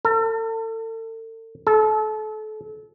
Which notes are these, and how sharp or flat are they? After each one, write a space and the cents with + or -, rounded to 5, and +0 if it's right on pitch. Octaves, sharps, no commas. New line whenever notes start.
A4 +40
A4 -30